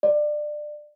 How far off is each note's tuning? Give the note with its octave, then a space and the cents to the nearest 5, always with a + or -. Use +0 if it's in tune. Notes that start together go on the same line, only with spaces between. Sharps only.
D5 +25